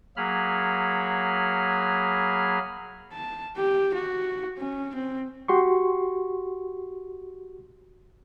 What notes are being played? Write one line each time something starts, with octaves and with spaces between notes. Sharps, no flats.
F#3 A#3 G#4 B5 F6
A5
G4
F#4
C#4
C4
F#4 G4 C6 C#6